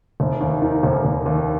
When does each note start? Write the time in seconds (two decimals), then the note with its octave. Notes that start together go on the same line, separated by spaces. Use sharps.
0.20 F1
0.41 D#2
0.62 D#3
0.83 F1
1.05 F1
1.26 D#2